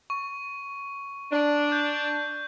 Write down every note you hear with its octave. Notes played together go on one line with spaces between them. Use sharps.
C#6
D4
G6